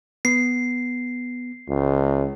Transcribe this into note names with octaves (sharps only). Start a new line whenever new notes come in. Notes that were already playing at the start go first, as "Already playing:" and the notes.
B3 C7
C#2